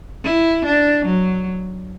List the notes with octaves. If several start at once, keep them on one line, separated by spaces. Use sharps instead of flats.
E4
D4
F#3